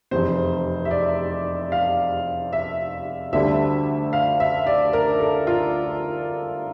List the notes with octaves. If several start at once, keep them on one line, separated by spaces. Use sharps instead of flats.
F1 E2 C3 C5
E5
D5
F5
E5
D2 D3 G3 E5
F5
E5
D5
A#4
A4
F4